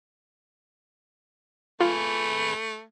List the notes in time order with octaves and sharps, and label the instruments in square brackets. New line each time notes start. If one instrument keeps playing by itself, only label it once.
[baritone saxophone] A3 [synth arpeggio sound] F4 [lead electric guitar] G#4 B4